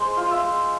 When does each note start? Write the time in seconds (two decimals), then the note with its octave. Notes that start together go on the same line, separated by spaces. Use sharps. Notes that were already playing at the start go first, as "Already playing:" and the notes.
Already playing: G#3 C5
0.17 F4
0.31 E5
0.44 G#3